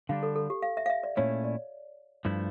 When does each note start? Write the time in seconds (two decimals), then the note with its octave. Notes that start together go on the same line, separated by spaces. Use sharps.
0.09 D3 G3 D4 F5
0.23 A4
0.36 A4
0.50 G4
0.63 F5
0.77 E5
0.86 F5
0.90 E5
1.03 D5
1.17 A#2 A3 C#4 E4 C#5
1.44 D5
2.25 G2 F3 A3 E4